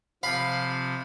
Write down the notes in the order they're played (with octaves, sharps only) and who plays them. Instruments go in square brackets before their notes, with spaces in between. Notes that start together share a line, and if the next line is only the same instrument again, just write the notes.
[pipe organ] C3 F3 [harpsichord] F5 B5